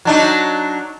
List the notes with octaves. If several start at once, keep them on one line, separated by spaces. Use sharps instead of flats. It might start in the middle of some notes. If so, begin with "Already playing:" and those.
F#3 D4 D#4